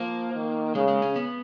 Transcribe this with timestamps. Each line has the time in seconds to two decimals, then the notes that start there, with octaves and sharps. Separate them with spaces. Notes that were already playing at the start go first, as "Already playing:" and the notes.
Already playing: F3 A#3
0.34 D#3
0.75 C#3 G#3
0.88 G#3
1.02 C#4
1.16 B3